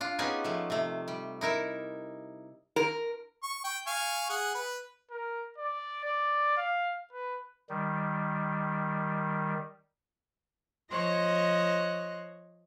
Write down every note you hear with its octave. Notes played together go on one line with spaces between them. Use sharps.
D4 F4
B3 C#4 D#4 G4 G#4 G#5
F3 A3
C3 A3
G3
D#4 E4 A#4 E5
A#4
C#6
G5
F5 G#5 C#6
G#4 F#5
B4
A#4
D5
D5
F5
B4
D#3 G3
F3 C5 C#5 D#5 F#6 A#6